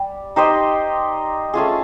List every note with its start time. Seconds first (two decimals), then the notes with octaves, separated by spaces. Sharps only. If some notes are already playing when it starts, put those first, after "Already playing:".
Already playing: G3
0.36 D#4 G4 C5 D#5
1.54 A3 C#4 F4 G#4